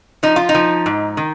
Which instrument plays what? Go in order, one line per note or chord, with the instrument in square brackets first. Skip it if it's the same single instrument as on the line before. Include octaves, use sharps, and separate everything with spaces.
[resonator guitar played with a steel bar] F3 D#4
F4
D#4
F3
G#2
D#3